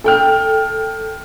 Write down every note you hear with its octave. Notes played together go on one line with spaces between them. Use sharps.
A4 G5 F6